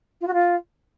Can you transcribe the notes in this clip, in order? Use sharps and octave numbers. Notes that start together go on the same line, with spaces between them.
F4
F#4
F4